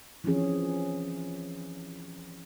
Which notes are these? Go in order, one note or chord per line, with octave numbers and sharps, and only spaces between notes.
E3 F3 C4 C#4 G#4